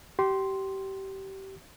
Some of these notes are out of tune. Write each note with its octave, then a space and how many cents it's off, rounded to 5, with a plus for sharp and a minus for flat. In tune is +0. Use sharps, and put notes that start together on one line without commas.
G4 -25 C6 +0